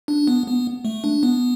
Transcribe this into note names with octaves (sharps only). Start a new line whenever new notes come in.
D4
B3
B3
A3
D4
B3